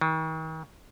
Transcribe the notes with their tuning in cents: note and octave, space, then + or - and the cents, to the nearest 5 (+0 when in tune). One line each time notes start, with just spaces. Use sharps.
D#3 +40